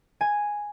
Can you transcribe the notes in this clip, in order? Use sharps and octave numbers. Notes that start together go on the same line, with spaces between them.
G#5